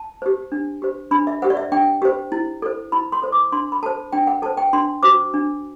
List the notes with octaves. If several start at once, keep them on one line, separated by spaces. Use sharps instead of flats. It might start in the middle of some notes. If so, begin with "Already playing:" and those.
Already playing: A5
G4 C5
D4
G4 C5
D4 B5
E5
G4 C5 F#5
D5
E5
D4 G5
G4 C5
E4
A4 C5
E4 B5
C6
A4 C5
D6
D4 C6
B5
A4 C5 A5
D4 G5
F#5
A4 C5 A5
G5
D4 C6
F#4 C5 D6
D4